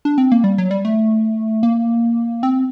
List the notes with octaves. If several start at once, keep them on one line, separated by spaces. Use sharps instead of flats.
D4
C4
A#3
G3
F#3
G3
A3
A#3
C4